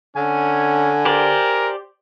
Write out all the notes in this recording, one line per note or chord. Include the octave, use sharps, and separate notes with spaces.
D3 C#4 G#5
G4 A#4 C5 D5